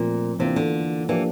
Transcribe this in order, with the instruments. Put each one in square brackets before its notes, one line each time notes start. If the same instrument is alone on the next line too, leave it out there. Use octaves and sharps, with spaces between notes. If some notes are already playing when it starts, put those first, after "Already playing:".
Already playing: [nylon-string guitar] A#2 [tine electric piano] F3 A3 C4
[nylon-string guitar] C3 [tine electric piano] E3 A#3 D4 F4
[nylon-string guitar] D3
[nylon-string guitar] E3 [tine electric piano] F3 A#3 D4 G4